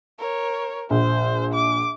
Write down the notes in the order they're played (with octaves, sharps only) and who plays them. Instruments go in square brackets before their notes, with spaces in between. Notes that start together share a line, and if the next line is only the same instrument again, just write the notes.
[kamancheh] A#4 C#5
[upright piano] A#1 [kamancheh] C5
[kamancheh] D6